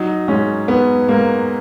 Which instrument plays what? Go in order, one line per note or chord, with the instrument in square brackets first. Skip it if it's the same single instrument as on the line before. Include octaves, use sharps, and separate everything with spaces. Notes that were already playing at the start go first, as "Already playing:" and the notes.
Already playing: [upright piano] F#3 [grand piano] D#4
[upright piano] G#2 [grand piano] C#4
[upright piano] G#2 [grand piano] B3
[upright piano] G#2 [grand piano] A#3